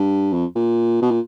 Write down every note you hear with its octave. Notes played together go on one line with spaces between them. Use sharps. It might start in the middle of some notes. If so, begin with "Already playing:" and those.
Already playing: G2
F2
A#2
B2
A#2